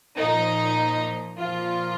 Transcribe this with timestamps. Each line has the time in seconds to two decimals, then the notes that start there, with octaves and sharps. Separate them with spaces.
0.16 A#2 F3 D#4
1.37 A#2 F3 F4